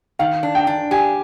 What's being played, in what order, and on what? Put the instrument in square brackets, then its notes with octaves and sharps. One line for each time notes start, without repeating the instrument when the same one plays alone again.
[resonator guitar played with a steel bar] D#3 [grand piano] F5
[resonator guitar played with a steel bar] D4
[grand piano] G5
[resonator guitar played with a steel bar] D4
[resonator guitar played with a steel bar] G4 [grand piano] G#5